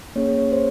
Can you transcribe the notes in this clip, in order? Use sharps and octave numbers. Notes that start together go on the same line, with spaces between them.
A#3 C#4 G#4 C#5
C#5
C5